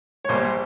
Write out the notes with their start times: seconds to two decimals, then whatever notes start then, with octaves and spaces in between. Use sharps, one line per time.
0.25 C#5
0.29 A#1 A#2 G3 C5
0.45 C5